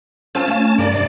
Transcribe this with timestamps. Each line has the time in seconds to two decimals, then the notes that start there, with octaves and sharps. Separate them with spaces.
0.35 C4 C#4 F4 C5 A5
0.47 A3 F5
0.78 G2 C#3 A#3 A#4 D5
0.91 F2 C3 F3